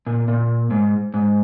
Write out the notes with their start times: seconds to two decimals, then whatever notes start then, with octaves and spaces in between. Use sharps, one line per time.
0.07 A#2
0.28 A#2
0.71 G#2
1.14 G#2